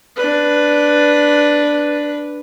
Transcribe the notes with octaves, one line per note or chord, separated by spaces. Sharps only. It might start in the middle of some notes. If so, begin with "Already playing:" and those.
D4 B4